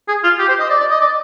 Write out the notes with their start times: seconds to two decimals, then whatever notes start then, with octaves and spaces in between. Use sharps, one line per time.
0.08 G#4
0.24 F4
0.39 G4
0.49 C5
0.59 D#5
0.70 D5
0.80 D5
0.91 D#5
1.01 D5